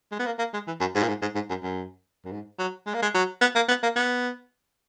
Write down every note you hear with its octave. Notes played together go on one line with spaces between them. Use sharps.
G#3
B3
A#3
A#3
G#3
E3
F#2
G#2
A#2
G#2
G#2
G#2
F#2
F#2
F#2
G#2
F#3
G#3
A#3
G#3
F#3
B3
A#3
B3
A#3
B3